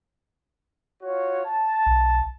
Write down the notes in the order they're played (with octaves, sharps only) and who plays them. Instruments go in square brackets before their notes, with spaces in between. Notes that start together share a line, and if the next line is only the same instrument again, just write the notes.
[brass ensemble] F4 F#4 C#5
A5
[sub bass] B1